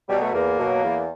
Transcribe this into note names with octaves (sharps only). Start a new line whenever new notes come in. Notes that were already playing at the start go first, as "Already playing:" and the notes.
B2 F#3 G3
A3
E2 A#3
B2 F#3
E2